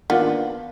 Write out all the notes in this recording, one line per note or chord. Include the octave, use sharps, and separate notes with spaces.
D#3 A#3 B3 D4 F4